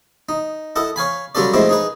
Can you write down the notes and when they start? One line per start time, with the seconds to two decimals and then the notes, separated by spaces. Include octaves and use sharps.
0.29 D#4
0.76 E4 A4 D#5 F#5
0.96 C#5 F5 G#5 B5
1.35 F#3 G3 C#4 F4 A4 D5
1.54 F3 G#3 A3 C4 E4
1.69 D#4 G#4 B4